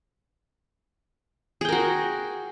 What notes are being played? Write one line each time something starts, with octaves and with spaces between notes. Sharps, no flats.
F#4 G#4 A#4 G5